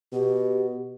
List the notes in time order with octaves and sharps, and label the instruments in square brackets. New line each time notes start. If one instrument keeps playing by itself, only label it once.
[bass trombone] B2 [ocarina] G4